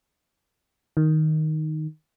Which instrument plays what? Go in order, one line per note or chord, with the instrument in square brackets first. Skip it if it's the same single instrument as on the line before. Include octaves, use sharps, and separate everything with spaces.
[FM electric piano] D#3